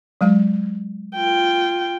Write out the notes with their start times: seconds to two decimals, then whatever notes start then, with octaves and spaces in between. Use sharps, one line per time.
0.21 F#3 G#3 F5
1.15 F4 G5